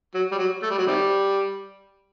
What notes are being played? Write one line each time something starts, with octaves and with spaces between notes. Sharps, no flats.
F#3
G3
F#3
A3
G3
F#3
C3 D#3 G3